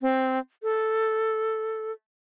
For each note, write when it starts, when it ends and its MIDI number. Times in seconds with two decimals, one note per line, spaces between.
0.02 0.39 60
0.63 1.92 69